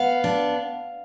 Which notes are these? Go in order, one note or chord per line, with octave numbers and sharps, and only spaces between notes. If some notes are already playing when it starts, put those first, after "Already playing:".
Already playing: B3 F5
D4